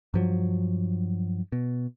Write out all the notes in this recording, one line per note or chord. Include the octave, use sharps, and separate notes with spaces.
G2 F3 F#3
B2